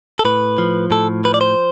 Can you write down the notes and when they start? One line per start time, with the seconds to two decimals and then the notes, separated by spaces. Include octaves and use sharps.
0.19 A4
0.25 A2 B4
0.58 F3
0.91 A2 A4
1.24 F3 B4
1.34 D5
1.41 C5